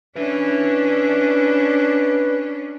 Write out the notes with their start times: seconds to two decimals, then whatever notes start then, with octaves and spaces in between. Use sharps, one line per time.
0.16 C#4 D4 B4 E5